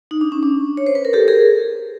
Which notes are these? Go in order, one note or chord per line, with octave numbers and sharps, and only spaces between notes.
D#4
D4
C#4
D4
C#5
C5
B4
A#4
G4 A4
G#4 A#4